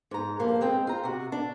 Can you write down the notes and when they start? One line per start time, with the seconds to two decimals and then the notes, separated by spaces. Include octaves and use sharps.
0.11 G#2 A#5
0.39 G2 F3 A#3
0.61 G#3 C4 G5
0.87 F4 A#5
1.04 C3 F#4
1.32 D4